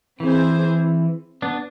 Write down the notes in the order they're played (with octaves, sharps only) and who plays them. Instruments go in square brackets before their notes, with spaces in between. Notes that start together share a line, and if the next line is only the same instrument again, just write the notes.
[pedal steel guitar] E3 [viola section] C4 G#4 C5
[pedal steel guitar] B3 D4